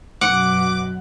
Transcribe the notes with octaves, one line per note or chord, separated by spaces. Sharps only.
F#2 B2 F#5 D6